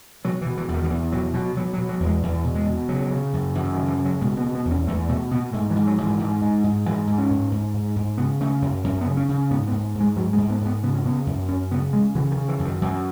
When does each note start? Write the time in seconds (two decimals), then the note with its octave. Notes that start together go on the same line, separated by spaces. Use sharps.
0.24 B2 F#3
0.41 E3
0.46 B2
0.57 E3
0.68 E2
0.74 D#3
0.84 D#3
0.90 E2 E3
1.12 B2 F#3
1.34 B2 F#3
1.56 B2 F#3
1.73 F#3
1.79 B2
1.89 F#3
2.00 E2
2.06 G#3
2.23 E2
2.44 B2
2.55 G#3
2.66 B2
2.89 C#3 F#3
3.11 C#3
3.33 F#2
3.55 F#2 E3
3.72 D#3
3.77 C#3
3.88 E3
3.99 C#3
4.05 F#3
4.21 B2 G#3
4.37 B3
4.44 B2
4.55 B3
4.65 E2
4.71 C#4
4.87 E2 A3
5.09 B2 A3
5.31 B2 B3
5.53 G#2 A3
5.70 E3
5.76 G#2
5.87 F#3
5.98 G#2
6.03 E3
6.19 G#2
6.41 G#2
6.64 G#2
6.86 G#2 E3
7.07 G#2
7.18 C#4
7.30 G#2
7.52 G#2
7.74 G#2
7.96 G#2
8.17 C#3 B3
8.40 C#3 A3
8.62 F#2
8.84 F#2 C#4
9.01 B3
9.06 C#3
9.17 C#4
9.29 C#3
9.50 G#2 B3
9.67 B3
9.72 G#2
9.95 G#2
10.00 G#3
10.16 G#2 F#3
10.33 G#3
10.38 G#2
10.50 B3
10.61 G#2 B3
10.83 C#3 B3
10.95 C#4
11.04 C#3 B3
11.27 F#2
11.49 F#2 C#4
11.71 C#3 B3
11.93 C#3 G#3
12.15 C#3 E3
12.31 D#3
12.36 C#3
12.49 E3
12.59 F#2
12.65 D#3
12.81 F#2 E3